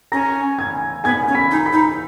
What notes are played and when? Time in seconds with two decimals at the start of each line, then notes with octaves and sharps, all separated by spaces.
0.12 C#4 A#5 A#6
0.58 G#5 G#6
1.04 B3 G#5 G#6
1.28 C#4
1.35 B5 B6
1.51 D#4
1.66 B5 B6
1.73 D#4